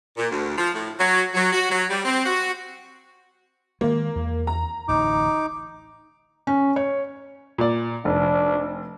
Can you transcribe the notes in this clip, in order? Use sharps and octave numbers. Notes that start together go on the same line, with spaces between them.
A#2
D2
F3
A2
F#3
F#3
F#4
F#3
G3
C4
F#4
D#3 G#3 A#3
E2
A#5
D1 A1 D#4 D6
C#4
C#5
A#2 D5
F1 D4